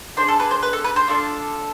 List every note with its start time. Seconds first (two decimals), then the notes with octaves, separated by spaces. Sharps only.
0.17 D4 G#4 C5
0.28 A4
0.40 B4
0.51 C5
0.62 B4
0.73 A4
0.84 B4
0.96 C5
1.08 D4 F4 A4